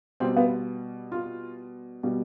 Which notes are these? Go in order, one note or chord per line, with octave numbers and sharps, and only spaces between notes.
B2 G3 C4
B3
F4
B2 G3